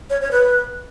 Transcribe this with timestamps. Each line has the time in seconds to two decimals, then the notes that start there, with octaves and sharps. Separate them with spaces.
0.10 C#5
0.21 C#5
0.32 B4